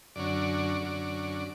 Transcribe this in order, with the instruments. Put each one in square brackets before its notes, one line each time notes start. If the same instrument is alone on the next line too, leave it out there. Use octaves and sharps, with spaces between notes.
[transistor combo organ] F#2 D3 F#3 C#4 D5
F#2 D3 F#3 C#4